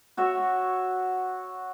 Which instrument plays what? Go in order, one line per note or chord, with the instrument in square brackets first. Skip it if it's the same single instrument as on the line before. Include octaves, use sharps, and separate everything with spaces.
[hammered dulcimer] F#4 C#5 E5